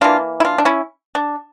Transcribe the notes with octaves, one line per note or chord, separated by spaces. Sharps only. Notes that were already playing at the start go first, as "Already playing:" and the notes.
E3 A#3 D4 F4
E4
D4 F4
D4
C#4 E4
D4